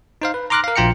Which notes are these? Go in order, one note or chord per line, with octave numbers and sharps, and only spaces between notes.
D#4 C5 F5
B4
A#5 C6 D6 F6 F#6 A#6
A#4 F5
A#1 F4 G5 A#5 C#7